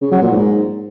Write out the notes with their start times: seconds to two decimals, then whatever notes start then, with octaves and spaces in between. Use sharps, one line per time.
0.01 C#3
0.12 F#3
0.22 A#2
0.32 G#2